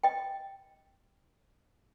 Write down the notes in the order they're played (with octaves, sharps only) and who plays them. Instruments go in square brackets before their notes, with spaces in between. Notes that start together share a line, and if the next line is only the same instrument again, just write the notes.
[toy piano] D#5 G5